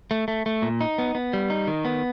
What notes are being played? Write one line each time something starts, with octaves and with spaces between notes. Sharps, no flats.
A3
A3
A3
A#2
D#4
B3
B3
G3
D#4
D#3
B3